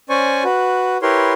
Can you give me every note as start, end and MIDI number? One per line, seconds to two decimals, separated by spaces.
0.09 0.44 61
0.09 0.44 72
0.09 0.44 74
0.09 0.44 80
0.09 0.44 85
0.44 0.97 66
0.44 0.97 71
1.02 1.33 64
1.02 1.33 67
1.02 1.33 70
1.02 1.33 71
1.02 1.33 73
1.02 1.33 84